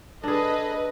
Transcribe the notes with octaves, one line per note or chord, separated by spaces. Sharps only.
D4 G#4 A4 B4 D#5